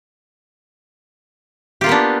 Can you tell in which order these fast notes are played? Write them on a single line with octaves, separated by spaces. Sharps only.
G4 F4 A#3 B3 D4